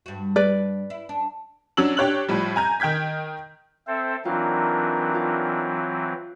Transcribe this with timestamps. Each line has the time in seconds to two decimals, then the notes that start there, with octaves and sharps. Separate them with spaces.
0.06 G2 F#4
0.36 B4 D5
0.90 E4
1.09 D4
1.77 F#3 C#4 D4 E6 F#7
1.97 D4 G4 C#5 F#6 F#7
2.29 A2 F3 G3
2.56 G#5 A#5 G6
2.80 D#3 G5 G6 G#6 B6
3.87 C4 A4 C5 E5
4.25 E3 F#3 C4 D4 D#4 F4 A#4
5.15 F4